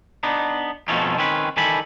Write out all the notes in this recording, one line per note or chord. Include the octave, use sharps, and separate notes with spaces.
B3 D4 D#4
F2 B2 F3 A3 C#4 D#4
D#3 C4 C#4 B4
D#3 E3 G3 A4 G#5 B5